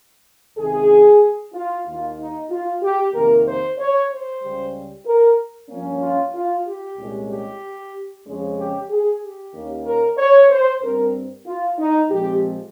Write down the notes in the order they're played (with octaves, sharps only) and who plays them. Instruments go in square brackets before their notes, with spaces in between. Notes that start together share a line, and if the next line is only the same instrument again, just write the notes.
[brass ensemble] C#2 C3 D#3 G#4
F4
D#2 D#3 A#3 F4
D#4
F4
G4
F2 C3 D#3 A#3 A#4
C5
C#5
C5
C#2 C#3 G3
A#4
G2 F3 A#3 C#4
F4
F4
G4
C2 A#2 G#3 C#4
G4
F2 C#3 F3 G#3 C#4
G4
G#4
G4
D#2 D#3 A#3 C#4
A#4
C#5
C5
G2 G3 C4 A#4
F4
D#4
A#2 F3 G#3 C4 G4